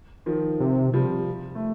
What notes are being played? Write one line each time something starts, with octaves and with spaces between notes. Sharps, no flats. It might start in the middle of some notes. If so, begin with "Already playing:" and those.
D#3 F3
C3
F3 G3
A3